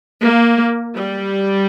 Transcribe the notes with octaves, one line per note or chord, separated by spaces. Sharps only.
A#3
G3